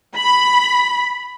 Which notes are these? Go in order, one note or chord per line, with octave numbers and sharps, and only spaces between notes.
B5